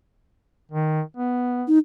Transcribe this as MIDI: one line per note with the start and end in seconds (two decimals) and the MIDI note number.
0.72 1.01 51
1.17 1.64 59
1.68 1.78 63